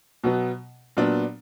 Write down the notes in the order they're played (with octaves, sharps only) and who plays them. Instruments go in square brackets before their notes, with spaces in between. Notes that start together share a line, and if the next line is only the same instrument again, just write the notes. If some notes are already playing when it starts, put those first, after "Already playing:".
[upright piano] B2 F#3 B3
A#2 F#3 B3 D4